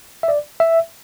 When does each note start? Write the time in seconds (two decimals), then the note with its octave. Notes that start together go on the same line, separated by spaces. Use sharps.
0.23 E5
0.28 D5
0.60 E5